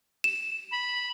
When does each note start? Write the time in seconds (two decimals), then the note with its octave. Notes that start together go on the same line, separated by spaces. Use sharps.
0.24 E7
0.72 B5